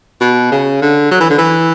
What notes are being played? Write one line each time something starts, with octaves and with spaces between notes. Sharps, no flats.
B2
C#3
D3
F#3
E3
D3
E3